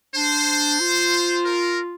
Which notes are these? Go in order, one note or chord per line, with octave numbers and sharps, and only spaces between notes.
D4 C5
F4
A#4